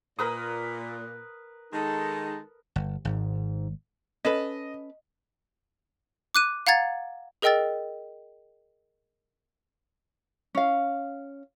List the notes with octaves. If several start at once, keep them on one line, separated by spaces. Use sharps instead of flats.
A#2 A#4 B4 D#6
D#3 G#3 D#4 A4
G1
G#1 G#2
C#4 A4 B4 D#5
D6 F#6 D#7
F5 F#5 A#5 G#6 A6
G#4 A#4 D#5 G5 E6 A6
C#4 F5